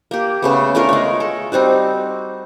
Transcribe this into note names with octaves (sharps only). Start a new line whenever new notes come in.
A#3 G4
C#3 A3 B3
A3 D4 F4 A#4
G#3 C#5
A4
G3 C4 D#4 F#4